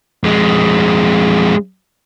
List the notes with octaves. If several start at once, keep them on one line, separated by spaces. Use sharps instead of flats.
F2 G#3